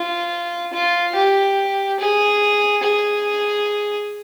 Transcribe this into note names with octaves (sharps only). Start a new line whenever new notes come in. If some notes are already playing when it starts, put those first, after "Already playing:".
Already playing: F4
F4
G4
G#4
G#4